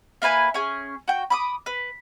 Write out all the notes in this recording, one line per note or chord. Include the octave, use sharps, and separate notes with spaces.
A#3 E4 B4 G#5
C#4 G#4
F#4 G5
B5 D6 D#6
B4